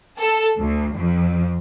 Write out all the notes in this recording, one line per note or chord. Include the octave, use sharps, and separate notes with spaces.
A4
D2
F2